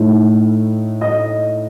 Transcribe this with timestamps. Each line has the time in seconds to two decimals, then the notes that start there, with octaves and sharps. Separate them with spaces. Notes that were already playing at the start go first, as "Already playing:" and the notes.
Already playing: A2 A3 D#4
1.01 D#5